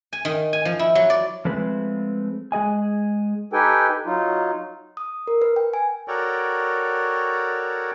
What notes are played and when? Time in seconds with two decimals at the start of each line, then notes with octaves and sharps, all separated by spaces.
0.13 G#5
0.25 D#3
0.53 G#5
0.65 F3
0.79 E4
0.95 F#3
1.10 D5
1.45 F3 G#3 A3 C4 B4
2.52 G#3 G#4 D#5 G#5
3.53 D#4 G4 A4 B4 G5 G#5
4.06 F#3 D#4 F4
4.97 D#6
5.27 A#4
5.42 B4
5.56 G5
5.74 G#5
6.08 F#4 A4 A#4 C#5 D5 G5